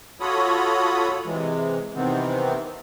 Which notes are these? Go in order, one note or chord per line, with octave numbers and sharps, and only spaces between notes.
F4 F#4 A4 C#5 B5 D#6
C3 E3 G#3
C3 D#3 E3 B3 C4